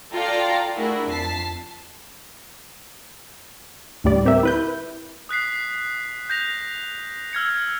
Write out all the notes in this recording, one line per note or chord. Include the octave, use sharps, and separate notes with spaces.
F4 A4 D5 F5 G5 A#5
A3 D4 E4 F#4 G#4 A#4
F2 A5 B6 C7
D2 A2 G3 D5
C4 G4 A#4 E5
E4 B4 G6
D#6 F#6 B6 C7
G6 A#6 F7
E6 F6 G#6 C#7